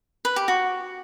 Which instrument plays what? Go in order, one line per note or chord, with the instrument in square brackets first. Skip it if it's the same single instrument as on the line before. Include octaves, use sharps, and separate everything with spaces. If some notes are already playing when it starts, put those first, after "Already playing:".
[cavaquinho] B4
G4
F#4